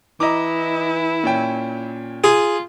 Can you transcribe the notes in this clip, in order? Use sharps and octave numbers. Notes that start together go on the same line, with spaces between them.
E3 E4 D#5 A#5 D6
A#2 C#4 G5
F4 G#4